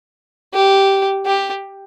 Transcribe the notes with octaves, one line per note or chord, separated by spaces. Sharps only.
G4
G4